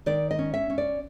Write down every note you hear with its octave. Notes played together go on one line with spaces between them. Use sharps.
D#3 D5
D#5
C#4
E5
C#4
D5